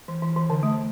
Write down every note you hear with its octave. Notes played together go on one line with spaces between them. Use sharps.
E3
E3
E3
D3
A3